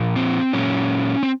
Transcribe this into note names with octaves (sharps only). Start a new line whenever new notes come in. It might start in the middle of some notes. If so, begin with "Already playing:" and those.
Already playing: A#2 F3
C4
A#2 F#3 C#4
C4